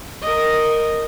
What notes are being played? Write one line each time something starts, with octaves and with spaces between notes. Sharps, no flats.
A#4 D#5